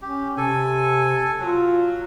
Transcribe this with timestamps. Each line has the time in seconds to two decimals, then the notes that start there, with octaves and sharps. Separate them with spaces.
0.02 C#4 G4
0.37 C3 A4 G#5
1.40 F#3 F4